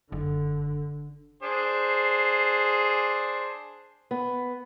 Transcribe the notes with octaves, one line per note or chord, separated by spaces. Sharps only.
F#1 D3
D4 G#4 C5
B3